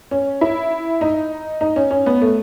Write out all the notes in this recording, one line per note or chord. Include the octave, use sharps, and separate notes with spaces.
C#4
E4
D#4
D#4
C#4
C#4
B3
A3